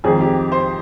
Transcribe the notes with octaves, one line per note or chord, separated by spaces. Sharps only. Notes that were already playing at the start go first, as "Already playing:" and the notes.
F2 D#3 G#3 G#4
G4
C5